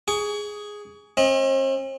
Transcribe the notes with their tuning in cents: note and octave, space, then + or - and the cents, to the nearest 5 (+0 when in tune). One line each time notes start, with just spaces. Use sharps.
G#4 +0 C#6 +35
C4 +45 D#5 +25